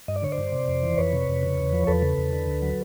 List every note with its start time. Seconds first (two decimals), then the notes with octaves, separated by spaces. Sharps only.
0.08 G2 D#5
0.16 D5
0.22 D3 C#5
0.32 C5 D5
0.38 G2
0.52 C3
0.68 F2
0.83 E3
0.98 F2 B4 C#5
1.13 C3
1.28 F2
1.43 C#3
1.58 E2
1.73 F3
1.87 E2 A4 B4
2.02 C#3
2.18 E2
2.33 D3
2.48 D2
2.62 F#3